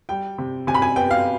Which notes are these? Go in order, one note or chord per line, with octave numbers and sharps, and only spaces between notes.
G3 G5
C3
C3 G#5
B5
G#5
B3 G5
F5